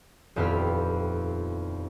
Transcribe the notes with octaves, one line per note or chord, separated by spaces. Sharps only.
D#1 F2 B3 E4 G4 F6